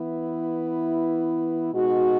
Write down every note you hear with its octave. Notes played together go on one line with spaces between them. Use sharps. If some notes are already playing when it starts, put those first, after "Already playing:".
Already playing: E3 B3 E4
B2 G#3 D#4 F#4